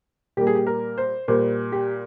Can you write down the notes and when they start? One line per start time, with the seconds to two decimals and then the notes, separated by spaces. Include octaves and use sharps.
0.37 A#2 G3 A#3 G4
0.47 G#4
0.55 G4
0.67 A#4
0.98 C5
1.28 A#2 G3 A#3 C5
1.72 G4